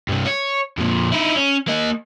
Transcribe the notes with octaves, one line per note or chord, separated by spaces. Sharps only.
G2 C3
C#5
F2 A#2
D#4 E4
C#4
A#3 D#5